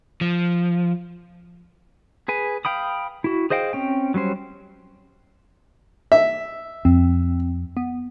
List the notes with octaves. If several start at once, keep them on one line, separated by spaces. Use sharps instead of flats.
F3
G#4 B4 G#5
F5 G5 B5 D#6
E4 F#4
G#4 C5 D#5 F5 G5
C4 C#4 G5
F#3 G3 C#4 C5
E5
F2 C4
B3